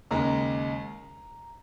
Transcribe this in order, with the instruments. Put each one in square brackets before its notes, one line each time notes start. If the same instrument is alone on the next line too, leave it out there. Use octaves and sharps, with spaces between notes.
[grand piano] D#2 C#3 G#3 A#5